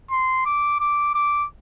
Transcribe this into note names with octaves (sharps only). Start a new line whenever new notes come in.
C6
D6
D6
D6